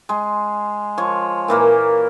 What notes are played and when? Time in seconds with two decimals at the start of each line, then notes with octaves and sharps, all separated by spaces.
0.09 G#3
0.98 F3 C#5
1.48 A#2 E3 A#3